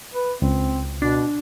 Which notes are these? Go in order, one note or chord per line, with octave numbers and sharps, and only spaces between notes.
B4
C#2 C4
B2 D4